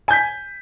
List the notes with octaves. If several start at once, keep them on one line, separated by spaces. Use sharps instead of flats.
G#5 G6 B6